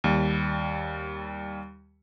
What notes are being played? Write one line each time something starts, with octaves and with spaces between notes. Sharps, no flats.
D#2 G3